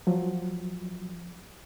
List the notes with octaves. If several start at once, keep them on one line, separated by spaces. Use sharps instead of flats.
F3 F#3